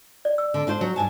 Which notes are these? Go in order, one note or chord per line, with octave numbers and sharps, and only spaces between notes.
D5
E6
D3
D4 F4 C5
F#3
G2 G#5 A5